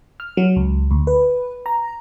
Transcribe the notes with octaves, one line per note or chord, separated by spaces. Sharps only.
F6
F#3
C#2
D2
B4
A#5